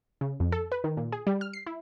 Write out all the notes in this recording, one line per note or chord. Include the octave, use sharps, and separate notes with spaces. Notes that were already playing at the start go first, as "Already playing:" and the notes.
C#3
F2
A4
B4
D#3
A#2
G#4
G3
F6
C7
E4